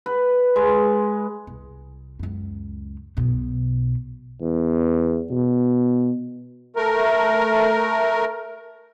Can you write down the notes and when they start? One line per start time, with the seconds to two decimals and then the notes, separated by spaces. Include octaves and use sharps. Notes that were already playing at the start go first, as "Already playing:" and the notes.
0.06 B4
0.56 G#3
1.47 C2
2.19 C#2 F#2
3.17 B1 B2
4.41 E2
5.31 B2
6.76 A3 A#4